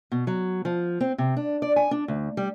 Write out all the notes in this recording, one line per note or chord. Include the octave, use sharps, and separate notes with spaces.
B2
F#3
F3
C4
C3
D4
D5
G#5
D4
D2
G3